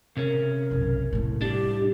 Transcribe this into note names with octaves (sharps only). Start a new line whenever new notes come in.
C3 C#4 A#4
B1 F#2
A2 C3
C2 D4 G4